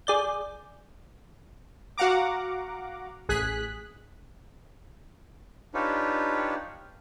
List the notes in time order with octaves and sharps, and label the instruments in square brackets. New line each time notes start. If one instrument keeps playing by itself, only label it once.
[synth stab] G#4 D5 G6
F#4 F5 F#5 A#5 D6
A1 G#4 F#6 B6
[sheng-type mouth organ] D4 D#4 F4 G4 B4 C#5